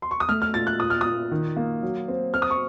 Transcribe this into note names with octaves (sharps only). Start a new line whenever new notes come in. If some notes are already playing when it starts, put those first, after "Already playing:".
C6
C#6
D#6
A3 F6
F6
A#2 A6
F#6
A#2 D#6
F6
A#2 D#6
D#3
A#3
F#3
C4
C4 F6
D#6
C#6